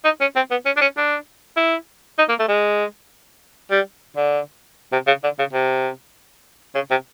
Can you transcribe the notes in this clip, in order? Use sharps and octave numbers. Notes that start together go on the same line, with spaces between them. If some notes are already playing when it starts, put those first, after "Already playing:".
D#4
C#4
C4
B3
C#4
D4
C#4
D4
E4
D#4
A#3
A3
G#3
G3
D3
C3
C#3
D3
C#3
C3
C#3
C3